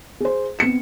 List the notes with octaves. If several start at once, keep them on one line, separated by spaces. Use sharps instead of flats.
G#4 C5
B3 C4 C#7 E7